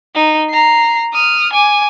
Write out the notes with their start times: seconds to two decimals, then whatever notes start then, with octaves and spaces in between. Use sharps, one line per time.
0.15 D#4
0.50 A#5 C7
1.13 D#6 F6
1.53 G#5 D6